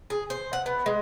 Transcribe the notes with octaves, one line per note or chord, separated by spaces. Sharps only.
G#4
C5
F#5
B3
G#3